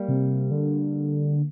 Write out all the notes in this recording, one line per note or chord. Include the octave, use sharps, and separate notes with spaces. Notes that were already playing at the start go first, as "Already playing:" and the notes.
Already playing: G3 A#3
C3
D3